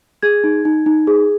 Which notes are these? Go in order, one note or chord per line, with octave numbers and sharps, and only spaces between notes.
G#4 G#6
D#4
D#4
D#4
G#4